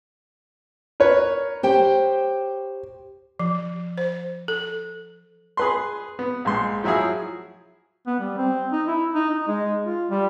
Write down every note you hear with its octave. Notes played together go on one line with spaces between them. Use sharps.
A#4 B4 C#5
G4 C5 G5
F3
C5
A4
G#4 B4 C6
B3
A#1 G#2 C6
F3 F#3 E4 F#4 G#4
B3
G3
C4
D#4
E4
D#4
D#4
G#3
F4
G3